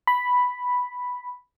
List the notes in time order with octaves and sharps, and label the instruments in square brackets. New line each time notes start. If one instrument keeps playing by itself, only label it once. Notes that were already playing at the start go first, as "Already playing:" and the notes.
[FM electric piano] B5